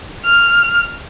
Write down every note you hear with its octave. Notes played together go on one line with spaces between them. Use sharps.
F6